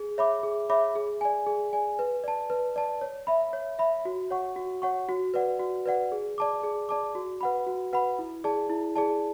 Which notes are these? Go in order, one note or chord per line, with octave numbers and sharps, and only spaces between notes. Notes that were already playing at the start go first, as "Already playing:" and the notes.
Already playing: G#4
C#5 E5 B5 D6
G#4
C#5 E5 B5 D6
G#4
D5 G#5
G#4
D5 G#5
B4
D5 A5
B4
D5 A5
C#5
E5 B5
C#5
E5 B5
F#4
C#5 F#5 C#6
F#4
C#5 F#5 C#6
F#4
B4 D5 F#5
F#4
B4 D5 F#5
G#4
D5 A5 D6
G#4
D5 A5 D6
F#4
B4 F#5 B5
F#4
B4 F#5 B5
E4
G#4 D5 A5
E4
G#4 D5 A5